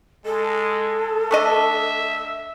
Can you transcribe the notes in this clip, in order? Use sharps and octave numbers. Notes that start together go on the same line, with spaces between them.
G#3 A4
A3 D4 D#5 E5